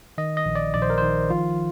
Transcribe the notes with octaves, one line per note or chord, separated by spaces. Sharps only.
D#3 D#5
D#5
A#1
D5
A#1 D5
C5
A#4
D#3 C5
F3 F4